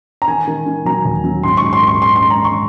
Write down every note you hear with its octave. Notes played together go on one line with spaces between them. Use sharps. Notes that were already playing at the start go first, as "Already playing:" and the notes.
A#5
D#3 G#5
D#3
D#3
F#3 A#5
D#2
F#3
G#2 C6
G#2 C#6
C6
D#3
C#6
G#3 C6
G#3 C6
A#5
G#3 C#6